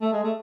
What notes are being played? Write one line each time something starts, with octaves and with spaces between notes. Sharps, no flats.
A3
G#3
A3